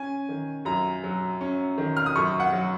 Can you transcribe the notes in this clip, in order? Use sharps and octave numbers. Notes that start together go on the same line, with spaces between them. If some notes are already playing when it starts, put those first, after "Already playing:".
Already playing: C#4 G#5
D#3
F#2 A#5
F#3
C#4
D#3
F6
D#6
F#2 C#6
F#5
F#3